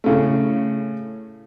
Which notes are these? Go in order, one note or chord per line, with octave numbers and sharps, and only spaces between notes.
A2 C#3 A3